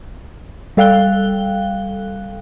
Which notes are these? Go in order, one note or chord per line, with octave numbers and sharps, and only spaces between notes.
G3 A4 F5 G5 F#6 G7